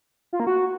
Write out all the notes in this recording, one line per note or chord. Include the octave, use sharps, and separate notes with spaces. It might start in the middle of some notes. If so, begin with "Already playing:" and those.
F4
A#3
F#4